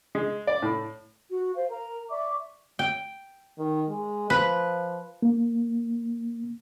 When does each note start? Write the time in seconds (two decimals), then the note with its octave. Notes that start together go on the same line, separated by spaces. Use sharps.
0.15 G#3
0.47 D5
0.62 A2
1.30 F#4
1.55 C5 F5
1.70 A#4 A#5
2.11 D5 E5 C#6 D6
2.79 G5
3.58 D#3
3.89 G#3
4.30 F3 B4
5.22 A#3